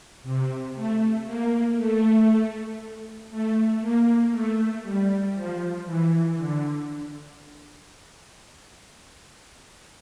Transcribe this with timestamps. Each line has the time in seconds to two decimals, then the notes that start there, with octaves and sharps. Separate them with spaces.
0.23 C3
0.74 A3
1.25 A#3
1.76 A3
3.30 A3
3.80 A#3
4.31 A3
4.83 G3
5.34 F3
5.85 E3
6.36 D3